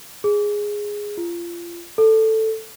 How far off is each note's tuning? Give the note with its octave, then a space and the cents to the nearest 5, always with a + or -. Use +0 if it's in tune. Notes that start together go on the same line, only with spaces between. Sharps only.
G#4 -5
F4 -25
A4 +5